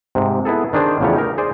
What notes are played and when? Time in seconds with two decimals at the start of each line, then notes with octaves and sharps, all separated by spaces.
0.15 G#2 C3
0.45 B3 E4 G#4 A4
0.73 D#3 D4 G#4 C5
1.00 E2 C#3 F3 A3 G4 C#5
1.16 D#4 A#4
1.38 G#4 C5 D5 G#5